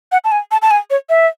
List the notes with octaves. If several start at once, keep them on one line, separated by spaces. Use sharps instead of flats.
F#5
A5
G#5
A5
A5
G#5
C#5
E5